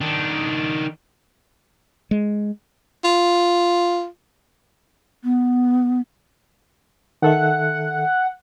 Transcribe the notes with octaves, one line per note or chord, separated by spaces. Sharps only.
D#3 D4
G#3
F4
B3
D#3 A4 E5 F#5